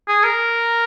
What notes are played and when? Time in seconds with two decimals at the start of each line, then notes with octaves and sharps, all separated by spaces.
0.08 G#4
0.24 A#4